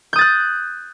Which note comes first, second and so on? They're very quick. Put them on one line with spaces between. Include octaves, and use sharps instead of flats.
G6 D#6 A6 F#6